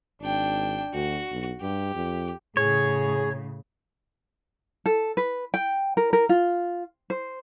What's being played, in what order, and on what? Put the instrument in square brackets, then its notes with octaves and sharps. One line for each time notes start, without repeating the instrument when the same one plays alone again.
[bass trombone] G#1 [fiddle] D4 G5
[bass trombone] D2 [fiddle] F#4
[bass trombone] B1
[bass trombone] G2 [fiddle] G4
[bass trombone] F2
[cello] A2 C#3 [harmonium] G#4 [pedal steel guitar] C#5
[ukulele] A4
B4
G5
A#4
A#4
F4
C5